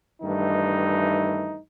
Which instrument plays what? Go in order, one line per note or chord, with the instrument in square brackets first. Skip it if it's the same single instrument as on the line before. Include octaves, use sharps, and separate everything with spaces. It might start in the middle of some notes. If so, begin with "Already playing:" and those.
[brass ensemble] G2 D#3 E3 A3 D#4